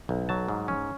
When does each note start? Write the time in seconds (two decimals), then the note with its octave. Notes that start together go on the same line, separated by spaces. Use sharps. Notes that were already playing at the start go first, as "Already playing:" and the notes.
0.09 B1
0.29 F#3 A5
0.48 G#2
0.68 C#4